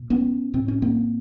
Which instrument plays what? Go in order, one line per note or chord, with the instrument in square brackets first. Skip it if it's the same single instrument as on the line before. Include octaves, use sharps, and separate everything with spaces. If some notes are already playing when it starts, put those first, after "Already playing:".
Already playing: [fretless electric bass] A#2
B3 C#4
A2 C4
C#4
A#3 C4